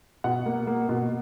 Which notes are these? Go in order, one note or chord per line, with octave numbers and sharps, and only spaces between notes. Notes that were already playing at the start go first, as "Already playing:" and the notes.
B2 F#5
A#3
A#3
B2